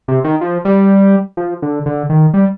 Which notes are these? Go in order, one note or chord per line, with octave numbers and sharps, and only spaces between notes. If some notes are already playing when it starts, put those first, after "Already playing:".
C3
D#3
F3
G3
F3
D3
D3
D#3
G3